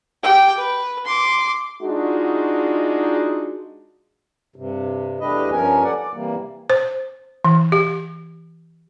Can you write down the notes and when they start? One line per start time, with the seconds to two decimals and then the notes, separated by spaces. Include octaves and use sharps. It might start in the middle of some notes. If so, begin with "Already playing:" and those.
0.23 G4 G5
0.58 B4
1.05 C6 D6
1.82 G#3 D4 D#4 F4 F#4
4.56 G2 C3
5.20 E2 A3 D4 G4 B4 D#5
5.52 G2 F3 C#4 A#4 G#5
5.84 A4 D5 F#5
5.98 D5
6.14 C3 E3 G3 A#3
6.70 C5
7.45 E3
7.72 G4